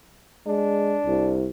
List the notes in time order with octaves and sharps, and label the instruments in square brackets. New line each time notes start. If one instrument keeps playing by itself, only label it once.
[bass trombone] G#3 [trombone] D4
[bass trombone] C2